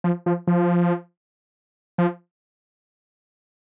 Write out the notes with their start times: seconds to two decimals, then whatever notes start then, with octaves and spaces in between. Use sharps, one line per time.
0.04 F3
0.26 F3
0.47 F3
1.98 F3